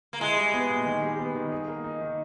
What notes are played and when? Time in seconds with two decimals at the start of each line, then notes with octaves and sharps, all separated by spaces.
0.13 A#3
0.20 G#3 E4
0.37 G3
0.54 B3
0.70 A#2
0.86 D#3
1.02 G3
1.19 B3
1.35 D#3
1.52 G#4
1.68 A#3
1.84 D#4
2.01 D#3